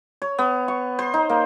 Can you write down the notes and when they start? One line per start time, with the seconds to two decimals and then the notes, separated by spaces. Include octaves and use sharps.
0.22 C#5
0.38 B3
0.68 C#6
0.99 C5
1.14 D#4
1.29 A#3